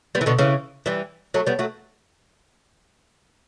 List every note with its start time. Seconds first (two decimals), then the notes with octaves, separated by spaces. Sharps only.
0.15 G3 B3
0.21 E3
0.26 B2 D3
0.39 C#3 E3
0.86 E3 G3
1.34 F#3 A3
1.47 G3 B3
1.59 F#3 A3